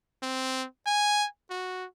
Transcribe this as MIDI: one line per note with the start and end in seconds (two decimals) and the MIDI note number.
0.22 0.66 60
0.86 1.27 80
1.50 1.86 66